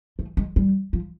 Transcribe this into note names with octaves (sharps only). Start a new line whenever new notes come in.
A3
G#3
G3
F3